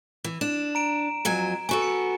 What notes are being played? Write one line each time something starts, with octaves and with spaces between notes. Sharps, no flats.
E3
D4 E7
A#5 D7
F2 F#3 G#5
B3 F#4 A4 G#5
C#7